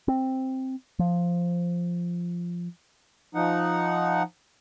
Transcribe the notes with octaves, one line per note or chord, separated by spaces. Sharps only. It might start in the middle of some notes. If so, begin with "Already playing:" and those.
C4
F3
F3 D#4 F#5